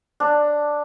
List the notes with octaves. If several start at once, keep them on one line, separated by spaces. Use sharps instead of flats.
D4